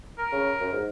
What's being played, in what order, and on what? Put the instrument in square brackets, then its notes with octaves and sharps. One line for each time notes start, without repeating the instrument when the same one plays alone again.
[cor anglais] A#4
[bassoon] C#3
F#2
G#2